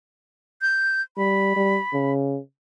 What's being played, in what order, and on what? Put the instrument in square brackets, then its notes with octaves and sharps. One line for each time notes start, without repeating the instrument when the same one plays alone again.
[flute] G6
[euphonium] G3 [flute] B5
[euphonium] G3
C#3